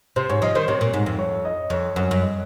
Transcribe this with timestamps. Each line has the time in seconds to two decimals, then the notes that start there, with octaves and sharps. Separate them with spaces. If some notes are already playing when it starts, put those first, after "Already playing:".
0.16 C3 C5
0.29 G#2 C#5
0.42 F3 D#5
0.55 D#3 C5
0.68 C3 C#5
0.81 A#2
0.93 G#2
1.06 F2
1.19 C#5
1.45 D#5
1.70 F2 C#5
1.96 F#2 C#5
2.11 F#2
2.22 D#5